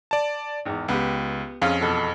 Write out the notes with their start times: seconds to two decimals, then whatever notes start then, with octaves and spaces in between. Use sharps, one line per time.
0.11 D5 A5
0.65 G#1 E2
0.88 C#2 B3 G4
1.62 F2 C#4 F4 G#4
1.81 E2 B2 A4